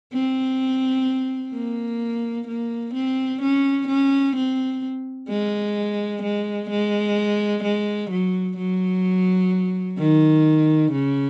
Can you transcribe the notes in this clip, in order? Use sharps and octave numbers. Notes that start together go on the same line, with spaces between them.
C4
A#3
A#3
C4
C#4
C#4
C4
G#3
G#3
G#3
G#3
F#3
F#3
D#3
C#3